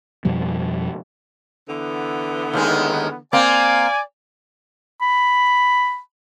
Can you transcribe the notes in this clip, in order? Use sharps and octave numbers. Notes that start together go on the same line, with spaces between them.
F2 B2 F3 G3
D3 E3 B3
D#2 D#3 G#3
A#3 C4 D5 G#5
B5